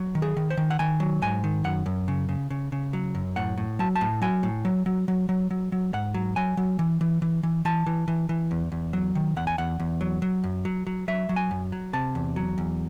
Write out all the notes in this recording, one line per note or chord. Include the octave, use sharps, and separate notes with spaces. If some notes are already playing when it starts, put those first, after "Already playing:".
Already playing: F#3
D#3
G#4
D#3
C5
D#3
F#5
D#3 G#5
F#3
G#2 G#5
D#3
F#2 F#5
F#2
C#3
C#3
C#3
C#3
F#3
F#2
A2 F#5
A2
F#3 A5
A5
A2
F#3 G#5
A2
F#3
F#3
F#3
F#3
F#3
F#3
G#2 F#5
F#3
F#3 G#5
F#3
E3
E3
E3
E3
E3 A5
E3
E3
E3
E2
E2
F#3
D#3
E2 F#5
G#5
E2 F#5
E2
F#3
F#3
F#2
F#3
F#3
F#3 E5
F#3
G#5
F#2
F#3
C3 A5
E2
F#3
E2